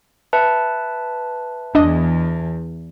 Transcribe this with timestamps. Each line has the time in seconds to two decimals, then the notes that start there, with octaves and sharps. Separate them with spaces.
0.33 B4 E5 A5
1.75 E2 D4 D#5